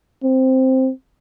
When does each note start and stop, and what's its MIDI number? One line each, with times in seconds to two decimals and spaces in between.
0.24 0.90 60